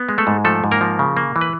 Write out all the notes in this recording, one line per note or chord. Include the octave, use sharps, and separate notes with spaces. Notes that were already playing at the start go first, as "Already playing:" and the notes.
Already playing: B3
G#3
A3 A4
G#2
F3 A3 A4
G#2
A#3 A#4
F3
C#3
A#3
E3
B4